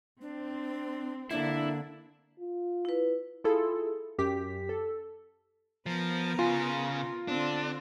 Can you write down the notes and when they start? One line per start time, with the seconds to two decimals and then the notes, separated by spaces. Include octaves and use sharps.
0.21 C4 D4
1.31 D3 A#3 D4 E4
2.39 F4
2.85 E4 B4
3.44 E4 F4 G#4 A4
4.18 F#2 G4 B6
4.69 A4
5.86 F3 B3 A#4
6.39 C#3 F4 G#5
7.28 D3 C4 D4